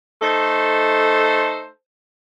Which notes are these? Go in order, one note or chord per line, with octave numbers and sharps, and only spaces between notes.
A3 D#4 A4 C5